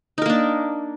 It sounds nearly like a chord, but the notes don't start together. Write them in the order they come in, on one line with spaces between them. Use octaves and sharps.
D#4 A#4 A#3 D4